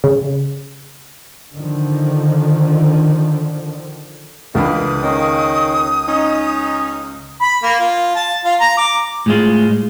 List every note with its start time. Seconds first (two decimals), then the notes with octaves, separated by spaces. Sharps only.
0.04 C#3
1.55 D3 D#3 F3
4.55 C#2 D3 E3 A#3 B5 D#6
5.03 D#3 A#3 C#4
6.07 C#4 D#4
7.41 B5
7.63 A#3
7.79 F4
8.16 A5
8.45 F4
8.60 A#5
8.78 D6
9.26 A2 G#3 F4